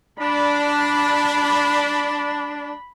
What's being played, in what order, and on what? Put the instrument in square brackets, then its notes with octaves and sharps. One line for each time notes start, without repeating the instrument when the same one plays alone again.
[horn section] D4 [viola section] B5